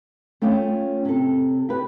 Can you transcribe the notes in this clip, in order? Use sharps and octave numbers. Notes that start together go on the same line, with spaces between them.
A3 C#4 F4 G5
C3 A4
G4 B4